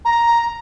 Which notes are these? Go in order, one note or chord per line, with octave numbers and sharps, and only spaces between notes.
A#5